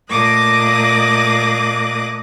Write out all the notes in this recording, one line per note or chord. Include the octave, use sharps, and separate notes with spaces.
A#2 A3 D#5 D6 D#6 F#6